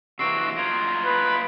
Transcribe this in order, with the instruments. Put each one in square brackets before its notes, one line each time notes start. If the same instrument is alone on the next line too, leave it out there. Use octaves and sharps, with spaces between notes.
[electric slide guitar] C3 E3 A#3 [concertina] F#4 E6 [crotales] C7 D7
[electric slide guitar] F#3 A#3 D#4 [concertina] F4 [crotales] G#6 D7
[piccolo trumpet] B4